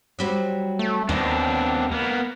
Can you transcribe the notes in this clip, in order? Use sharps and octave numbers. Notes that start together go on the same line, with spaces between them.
F#3 G3 C4
A3
D#2 B3 C4 D4 D#4
A#3 B3